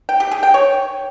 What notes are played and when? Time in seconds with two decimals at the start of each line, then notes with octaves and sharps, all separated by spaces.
0.09 G5
0.20 G4
0.31 G#4
0.43 G5
0.54 C#5